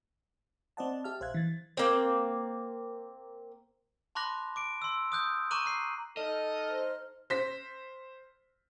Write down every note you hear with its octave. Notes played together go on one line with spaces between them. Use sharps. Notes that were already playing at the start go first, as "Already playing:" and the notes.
C4 C5 D5 D#5 F#5 A5
G4 E5 A5 F6
A#1 C5 E5 F5 F#6 G#6
E3 A6
A#3 C4
A5 B5 C6 D6 F#6 A#6
D6 D7
C6 E6
D#6 F#6 G6
A#5 C#6 D6 F#6 D#7 F#7
A#5 F#6 C7
D#4 A4 D#5 F6
C5
C5 B6